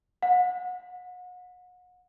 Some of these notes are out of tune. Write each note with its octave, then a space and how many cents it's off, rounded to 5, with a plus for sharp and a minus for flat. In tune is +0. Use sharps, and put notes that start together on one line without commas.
F#5 -35